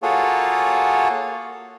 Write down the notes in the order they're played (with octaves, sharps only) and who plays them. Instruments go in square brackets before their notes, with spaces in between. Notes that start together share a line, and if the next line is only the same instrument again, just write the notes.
[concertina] A#3 F4 F#4 G#4 A4 C#5